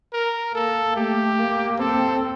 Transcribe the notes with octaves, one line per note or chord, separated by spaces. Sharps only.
A#4
A#3 A4
A3 G4
A#3
C4 A4